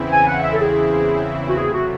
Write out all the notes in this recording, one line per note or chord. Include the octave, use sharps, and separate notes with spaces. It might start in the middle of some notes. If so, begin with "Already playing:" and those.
Already playing: E2 C#3 E3 C4 E4
G#5
F#5
E5
A4
G#4
F#4
C3 F#3 A3 G#4
F#4